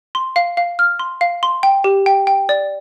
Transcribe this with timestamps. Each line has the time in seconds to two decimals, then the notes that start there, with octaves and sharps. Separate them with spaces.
0.15 C6
0.36 F5
0.57 F5
0.79 F6
0.99 C6
1.21 F5
1.43 C6
1.63 G5
1.84 G4
2.06 G5
2.27 G5
2.49 D5